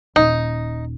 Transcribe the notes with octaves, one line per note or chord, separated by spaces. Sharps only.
D#1 D#4